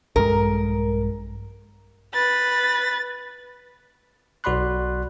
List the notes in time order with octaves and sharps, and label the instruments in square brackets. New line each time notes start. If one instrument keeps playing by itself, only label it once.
[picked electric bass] A#1 G2 G#3 [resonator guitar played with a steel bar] A#4
[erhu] B4 [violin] A6
[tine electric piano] B1 F#4 D5 B5 C6 F#6